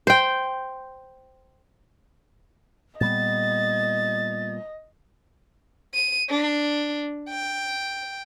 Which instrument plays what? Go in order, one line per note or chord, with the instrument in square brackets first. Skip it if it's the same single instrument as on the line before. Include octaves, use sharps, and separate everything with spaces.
[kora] C5 G5
[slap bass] A#2 G3 B3 [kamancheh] D#5 [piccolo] A6
[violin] D#7
D4
G5